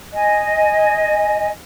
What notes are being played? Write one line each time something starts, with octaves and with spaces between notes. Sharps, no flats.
D#5 G#5